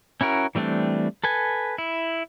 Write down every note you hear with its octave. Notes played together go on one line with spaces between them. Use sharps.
C#4 E4 F#4 A#4
E3 G3 A3 C4 D4
A4 B4 G#5
E4